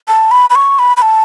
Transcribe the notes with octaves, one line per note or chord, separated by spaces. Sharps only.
A5
B5
B5
C#6
B5
B5
A5